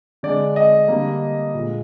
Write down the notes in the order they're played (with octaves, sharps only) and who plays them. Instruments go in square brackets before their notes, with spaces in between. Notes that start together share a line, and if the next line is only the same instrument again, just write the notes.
[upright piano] D3 G#3 D5
D#5
D3 G3 A#3
A#2 G#3